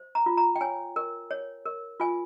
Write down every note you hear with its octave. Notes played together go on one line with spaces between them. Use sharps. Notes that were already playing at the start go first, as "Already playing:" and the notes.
Already playing: C5
A#5
F4
A#5
G5
C#5 G#5
A#4
C#5
A#4
F4 G#5